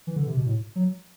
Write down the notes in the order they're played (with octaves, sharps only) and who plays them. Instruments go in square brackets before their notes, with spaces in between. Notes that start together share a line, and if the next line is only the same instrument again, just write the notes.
[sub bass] E3
D3
C3
B2
A2
F#3